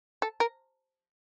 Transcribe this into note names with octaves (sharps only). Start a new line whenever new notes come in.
A4
A#4